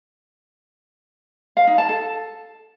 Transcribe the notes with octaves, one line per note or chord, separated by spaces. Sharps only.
F5
D#4
A5
A4